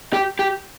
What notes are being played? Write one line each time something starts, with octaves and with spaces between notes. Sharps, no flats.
G4
G4